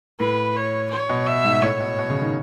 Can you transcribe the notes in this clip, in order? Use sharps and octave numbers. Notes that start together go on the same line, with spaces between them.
A2 B4
C#5
C#5
B2
E5
G#2
A2 C#5
B2
B2
C#3
D#3